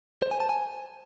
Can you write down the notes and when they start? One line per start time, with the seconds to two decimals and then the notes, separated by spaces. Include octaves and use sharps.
0.22 C5
0.31 G#5
0.40 A5
0.49 G#5